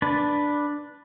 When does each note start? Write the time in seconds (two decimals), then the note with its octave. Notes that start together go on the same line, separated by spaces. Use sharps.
0.02 D4 B4 A5